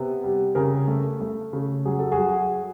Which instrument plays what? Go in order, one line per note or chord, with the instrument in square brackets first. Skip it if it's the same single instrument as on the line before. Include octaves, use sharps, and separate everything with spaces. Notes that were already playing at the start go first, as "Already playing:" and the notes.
Already playing: [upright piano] C3 B3
G3
C#3 G#4 A#4
A3
A3
C#3
F#3 G#4
A4
F#4 G#4
F#3